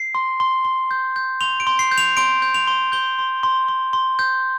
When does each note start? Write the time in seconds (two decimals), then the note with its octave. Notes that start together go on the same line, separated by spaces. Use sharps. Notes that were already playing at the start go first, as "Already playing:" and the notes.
Already playing: C7
0.15 C6
0.40 C6
0.65 C6
0.91 G6
1.16 G6
1.41 C6 F7
1.60 D7
1.67 C6
1.79 C7
1.91 G6
1.98 F7
2.17 C6 D7
2.42 G6
2.54 F7
2.67 C6
2.92 G6 G7
3.19 C6
3.43 C6
3.69 C6
3.93 C6
4.19 G6